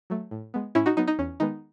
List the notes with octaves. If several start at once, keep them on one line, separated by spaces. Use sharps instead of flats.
F#3 A3
A2
G#3 B3
A2 C#4 E4
D#4 F#4
F#3 B3 D#4
D#4
E2 C#4
D#3 G#3 B3 D#4